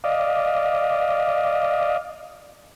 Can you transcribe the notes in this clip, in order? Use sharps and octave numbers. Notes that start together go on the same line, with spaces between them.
D5 D#5 F5